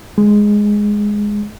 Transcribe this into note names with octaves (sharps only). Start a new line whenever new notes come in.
G#3